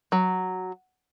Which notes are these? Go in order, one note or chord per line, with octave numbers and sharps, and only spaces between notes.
F#3